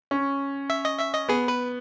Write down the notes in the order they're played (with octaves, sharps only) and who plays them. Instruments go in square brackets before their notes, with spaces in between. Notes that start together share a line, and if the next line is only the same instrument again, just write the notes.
[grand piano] C#4
[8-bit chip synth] E5
D#5
E5
D#5
[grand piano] B3 [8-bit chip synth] G#4
[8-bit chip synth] B4